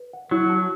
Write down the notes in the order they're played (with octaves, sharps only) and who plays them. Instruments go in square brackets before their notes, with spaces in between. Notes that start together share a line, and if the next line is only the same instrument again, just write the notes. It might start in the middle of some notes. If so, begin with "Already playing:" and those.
Already playing: [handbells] B4
F#5
[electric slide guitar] F#3 [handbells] E4
[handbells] A5